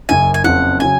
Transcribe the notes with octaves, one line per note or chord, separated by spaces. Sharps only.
F#1 F#2 C#3 G#5
G#5
F#1 F2 C#3 F#5
C#3 F#3 G#5